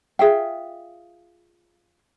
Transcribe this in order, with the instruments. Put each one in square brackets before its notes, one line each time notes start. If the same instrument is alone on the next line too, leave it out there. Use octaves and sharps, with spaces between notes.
[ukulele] F4 G#4 E5 G5